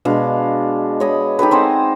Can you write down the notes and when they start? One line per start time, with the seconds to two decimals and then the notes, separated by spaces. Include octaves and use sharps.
0.05 B2 G#3 D4 F5
1.00 C#5 D#5 B5
1.39 D#4 G4 A4 B4
1.51 C4 C5 F#5 G#5